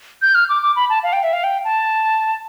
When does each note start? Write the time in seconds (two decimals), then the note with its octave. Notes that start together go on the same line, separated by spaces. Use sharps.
0.22 G6
0.35 F6
0.49 D6
0.62 D6
0.76 B5
0.90 A5
1.03 F5
1.13 G5
1.23 E5
1.33 F5
1.44 G5
1.64 A5